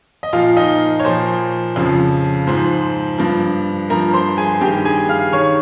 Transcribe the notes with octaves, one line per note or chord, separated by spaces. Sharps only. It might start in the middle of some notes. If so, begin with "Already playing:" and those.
D#5
A#2 F3 F4 F5
D#4 D#5
C#5
A#2 F3 C5
F2 C#3 F3
G#2 F3 C5
G2 F3
G2 F3 A#4 A#5
C5 C6
G#4 G#5
G2 D#3 G4 G5
G#4 G#5
F5 F6
D#3 C#5 C#6